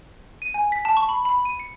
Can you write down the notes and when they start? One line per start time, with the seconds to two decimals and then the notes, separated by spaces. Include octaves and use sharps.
0.42 D#7
0.54 G#5
0.72 B6
0.85 A5
0.97 C#6
1.09 B5
1.25 B5
1.45 D#7
1.60 C#7